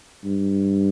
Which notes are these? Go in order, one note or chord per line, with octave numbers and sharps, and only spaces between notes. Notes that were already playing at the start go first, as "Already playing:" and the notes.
G2